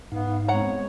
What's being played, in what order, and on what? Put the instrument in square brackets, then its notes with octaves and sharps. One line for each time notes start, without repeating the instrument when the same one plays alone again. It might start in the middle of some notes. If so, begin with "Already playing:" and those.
[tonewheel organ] G#2 D#4 F5 [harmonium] B3
[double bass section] G#3 B3 C4 [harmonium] C#5 [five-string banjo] F#5 A#5